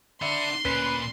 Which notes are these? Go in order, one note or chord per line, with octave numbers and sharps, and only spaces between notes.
D4 D5 E5 F#5 B5 C6
D2 A#2 C#4 B4